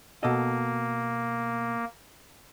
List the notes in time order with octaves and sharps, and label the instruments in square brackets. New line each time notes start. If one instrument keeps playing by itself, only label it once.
[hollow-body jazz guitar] B2 A4 D#5 [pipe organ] A#3